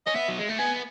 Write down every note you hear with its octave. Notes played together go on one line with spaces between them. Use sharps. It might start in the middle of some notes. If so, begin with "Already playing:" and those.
C#4 D#5
B3 E5
F#3
G#3
A3
B3 G#5